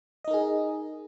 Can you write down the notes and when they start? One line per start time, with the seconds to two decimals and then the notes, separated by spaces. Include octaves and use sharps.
0.25 D#5
0.28 D#4
0.31 A#4
0.34 G#4